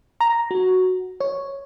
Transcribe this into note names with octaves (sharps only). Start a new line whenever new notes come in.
A#5
F#4
C#5